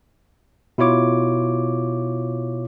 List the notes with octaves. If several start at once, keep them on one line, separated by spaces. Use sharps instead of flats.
B2 E4 F4 C#5 D6